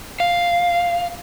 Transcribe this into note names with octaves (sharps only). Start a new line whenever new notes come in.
F5